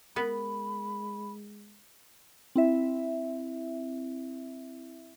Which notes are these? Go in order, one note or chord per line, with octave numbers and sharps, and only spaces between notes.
G#3 B3 A#4 B4 B5
C4 E4 E5